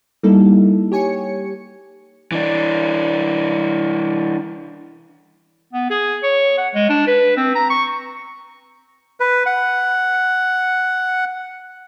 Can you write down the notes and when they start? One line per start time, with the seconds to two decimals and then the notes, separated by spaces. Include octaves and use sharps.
0.23 G3 A#3 D#4 E4 A4
0.92 G4 C#5 G#5 C#7
2.32 E3 D4
5.73 B3
5.90 G#4
6.23 C#5
6.58 F#5
6.74 G#3
6.89 D4
7.07 B4
7.37 C4
7.55 A#5
7.70 C#6
9.20 B4
9.46 F#5